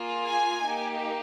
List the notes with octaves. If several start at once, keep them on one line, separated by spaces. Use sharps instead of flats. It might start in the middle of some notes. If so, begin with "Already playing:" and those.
Already playing: A#3 F4 G#4
G#5
A#3 D#4 G4